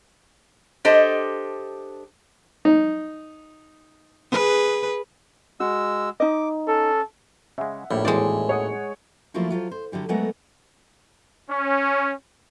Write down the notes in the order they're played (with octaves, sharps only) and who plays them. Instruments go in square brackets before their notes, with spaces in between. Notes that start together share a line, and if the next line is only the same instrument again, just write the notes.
[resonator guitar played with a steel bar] D4 G4 A4 C5 D#5
[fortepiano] D#4
[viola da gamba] G#4 B4
[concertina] G#3 E6 [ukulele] F#4
[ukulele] D#4 D#5 [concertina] D6
[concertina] C#4 [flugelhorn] A4
[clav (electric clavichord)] C#3 G#3 [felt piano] E5 F#5
[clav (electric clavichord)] A#1 G3 C#5 [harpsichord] A2
[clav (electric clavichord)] G#1 D#2 C5 [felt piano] E3 [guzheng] G#3 D5
[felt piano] C#5 F#5 D#6
[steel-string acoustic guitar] F3 F#3 A3 A#3 E4 F4
F#3 F4 A4 C5
C5
D3 F#3 G3 E4
F#3 G#3 A3 B3 A#4 F#5
[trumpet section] C#4